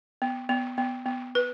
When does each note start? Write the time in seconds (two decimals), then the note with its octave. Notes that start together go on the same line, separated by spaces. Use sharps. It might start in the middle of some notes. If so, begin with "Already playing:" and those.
0.22 B3
0.49 B3
0.78 B3
1.06 B3
1.35 B4